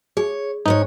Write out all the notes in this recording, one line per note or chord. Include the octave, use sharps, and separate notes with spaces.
G#4 C#5
G#2 D#4 B4 C#5